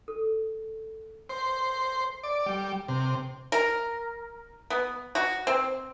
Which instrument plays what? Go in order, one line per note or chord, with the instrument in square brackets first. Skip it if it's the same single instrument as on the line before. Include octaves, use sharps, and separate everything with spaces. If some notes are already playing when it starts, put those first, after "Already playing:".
[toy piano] A4
[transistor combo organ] C5
D5
G3
C3
[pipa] A#4
B3
F#4
C4